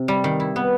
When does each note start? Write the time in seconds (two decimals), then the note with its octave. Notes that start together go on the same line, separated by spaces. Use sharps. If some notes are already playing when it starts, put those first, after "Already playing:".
Already playing: C3
0.08 G3
0.24 D#3
0.40 E4
0.56 B3